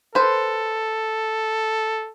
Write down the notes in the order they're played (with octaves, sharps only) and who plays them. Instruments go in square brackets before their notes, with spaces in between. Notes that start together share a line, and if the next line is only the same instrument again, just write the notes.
[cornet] A4 [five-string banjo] B4 C5